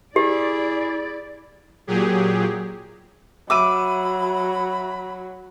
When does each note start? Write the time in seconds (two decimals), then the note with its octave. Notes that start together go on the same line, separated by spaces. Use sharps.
0.16 E4 G4 G#4 D5
1.87 A#2 F#3 G4 G#4
3.50 F#3 E5 B5 D6 E6 D#7